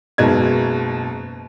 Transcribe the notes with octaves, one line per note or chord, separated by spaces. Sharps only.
F#1 B2 G#3 D#4 G#6